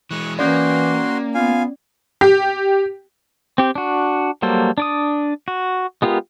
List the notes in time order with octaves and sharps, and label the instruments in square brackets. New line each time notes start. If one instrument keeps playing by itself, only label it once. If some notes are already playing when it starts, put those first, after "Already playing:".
[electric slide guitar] E3 G#3 [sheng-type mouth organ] C#6 F#6
[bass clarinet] E3 [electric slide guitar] A#3 [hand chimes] C#4 D5 [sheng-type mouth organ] F#4 C6
[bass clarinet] B3 [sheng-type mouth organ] F4 F5 G#5
[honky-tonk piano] G4
[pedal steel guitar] C4 G4
D4 F#4
F#3 G3 A#3 A4 C5
D4 D5 D#6
F#4
G#3 B3 F4 G4 A#4